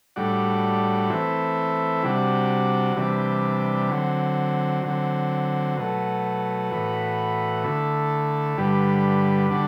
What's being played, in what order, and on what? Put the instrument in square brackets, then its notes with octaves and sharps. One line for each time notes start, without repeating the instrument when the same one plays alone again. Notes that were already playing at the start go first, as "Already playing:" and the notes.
[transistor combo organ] A2 G3 D4 F#4
E3 A3 C4 E4
C3 G3 D4 F#4
C3 E3 G3 D4
D3 F#3 C4
D3 F#3 C4
B2 F#3 A3
A2 E3 B3 F#4
D3 A3 E4
G2 D3 G3 B3
D3 G3 D4 F#4